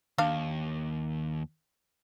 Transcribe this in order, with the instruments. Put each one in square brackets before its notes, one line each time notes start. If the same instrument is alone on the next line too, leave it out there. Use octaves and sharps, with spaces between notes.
[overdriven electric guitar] D#2 [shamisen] D4 F5